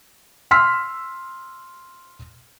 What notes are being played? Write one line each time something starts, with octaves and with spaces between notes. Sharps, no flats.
C6 E6 F6 B6